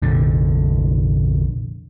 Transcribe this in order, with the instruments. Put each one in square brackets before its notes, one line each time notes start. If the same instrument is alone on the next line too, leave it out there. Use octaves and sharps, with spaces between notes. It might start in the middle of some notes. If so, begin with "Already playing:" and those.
[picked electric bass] F1 A#1 D3